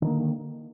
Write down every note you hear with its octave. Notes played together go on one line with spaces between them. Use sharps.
D3 D#3 A#3